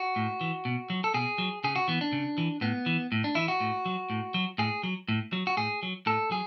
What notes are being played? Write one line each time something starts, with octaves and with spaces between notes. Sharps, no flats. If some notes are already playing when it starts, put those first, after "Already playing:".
Already playing: F#4
A2
E3
B2
F#3
A4
B2 G#4
F#3
C#3 G#4
F#4
E3 B3
D4
C#3
E3
A2 B3
E3
A2
D4
E3 E4
F#4
A2
F#3
A2
F#3
A2 G#4
F#3
A2
F#3
F#4
A2 G#4
F#3
A2 A4
F#3 G#4